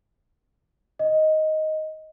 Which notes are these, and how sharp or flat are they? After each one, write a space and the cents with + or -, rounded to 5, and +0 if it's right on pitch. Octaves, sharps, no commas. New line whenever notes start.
D#5 +5